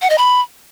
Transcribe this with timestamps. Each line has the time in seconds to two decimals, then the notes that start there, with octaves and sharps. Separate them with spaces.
0.02 F#5
0.10 D#5
0.18 B5